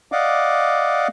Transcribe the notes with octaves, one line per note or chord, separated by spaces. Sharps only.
D5 D#5 F5 F#5 D6